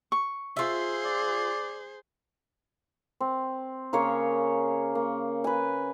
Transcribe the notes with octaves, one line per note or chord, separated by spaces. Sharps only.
C#6
F4 G#4 C5 E5
D5
C4
C#3 A#3 G#4 C#5
A#3
B4 G#5